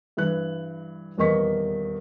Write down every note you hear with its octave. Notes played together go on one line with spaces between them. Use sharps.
G2 E3 F#6
D#1 E2 A#3 D#5 C#6 B6